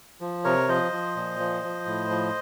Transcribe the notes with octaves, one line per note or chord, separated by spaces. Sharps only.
F3
C3 A#4 C#5
F3 C5 D#5
F3
A#2
F3
F3
A2
F3